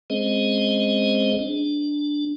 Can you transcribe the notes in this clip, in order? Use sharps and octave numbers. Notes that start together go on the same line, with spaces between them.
G#3 C4 C#4 G#4 C5 D#5
D4